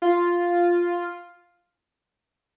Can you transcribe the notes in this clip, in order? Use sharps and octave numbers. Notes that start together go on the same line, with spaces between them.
F4